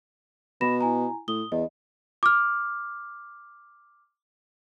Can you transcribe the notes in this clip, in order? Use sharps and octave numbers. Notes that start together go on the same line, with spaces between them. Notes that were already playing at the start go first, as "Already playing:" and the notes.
B2 B5 A#6 E7
E4 G#5 A#5
A2 D#6 G7
E2 D#5
D6 F6